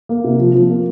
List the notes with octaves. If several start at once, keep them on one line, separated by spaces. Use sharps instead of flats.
A#3
C3
F3
F3
A#3